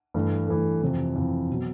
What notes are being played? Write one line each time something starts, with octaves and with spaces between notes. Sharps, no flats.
G2 E3 A3
G2 E3 A3
F2 C3 E3
F2 C3 E3
B2 F#3